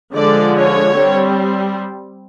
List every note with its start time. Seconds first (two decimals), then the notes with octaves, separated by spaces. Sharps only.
0.14 D3 F3 G#3 D5
0.55 C#5
0.95 G3 C4